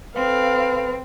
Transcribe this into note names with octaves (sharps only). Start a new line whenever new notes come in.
C4 A4 B4 F5